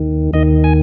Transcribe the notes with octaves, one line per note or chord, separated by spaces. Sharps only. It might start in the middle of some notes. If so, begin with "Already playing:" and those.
Already playing: D#2 D#3
D#2 D#3 D#5
G#5